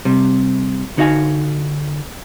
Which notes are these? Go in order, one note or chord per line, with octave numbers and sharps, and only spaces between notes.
C3 G3
D3 D#4 F#4 D#5 F5 G#5